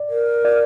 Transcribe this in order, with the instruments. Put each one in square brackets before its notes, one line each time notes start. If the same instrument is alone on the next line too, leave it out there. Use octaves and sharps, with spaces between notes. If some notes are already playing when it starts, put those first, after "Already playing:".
Already playing: [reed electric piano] D5
[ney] A#4
[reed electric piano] D5